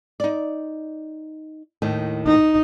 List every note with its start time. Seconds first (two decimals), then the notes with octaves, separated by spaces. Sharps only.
0.20 D#4 D5
1.82 D#2 A2 D#3
2.26 D#4